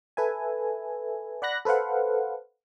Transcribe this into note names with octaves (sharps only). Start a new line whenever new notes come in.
A4 B4 E5 G#5
D5 F#5 B5 F#6 A#6
A4 B4 C5 F5 F#5